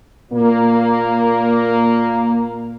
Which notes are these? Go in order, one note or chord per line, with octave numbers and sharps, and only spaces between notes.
A#2 A#3